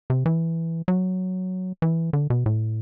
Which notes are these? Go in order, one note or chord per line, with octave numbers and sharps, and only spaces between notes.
C3
E3
F#3
E3
D3
B2
A2